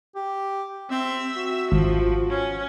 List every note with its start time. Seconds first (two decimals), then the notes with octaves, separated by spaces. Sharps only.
0.15 G4
0.91 C4 E5
1.37 F#4
1.72 G#1 F3
2.30 C#4